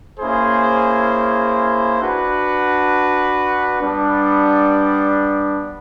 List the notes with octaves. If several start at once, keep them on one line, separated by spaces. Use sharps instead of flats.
A#3 C#4 E4 G#4 C5
D4 F#4 B4
G3 B3 D4